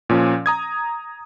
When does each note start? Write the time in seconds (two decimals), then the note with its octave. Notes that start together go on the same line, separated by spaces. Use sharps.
0.09 A#2 F3 C#4
0.46 A#5 D#6 G#6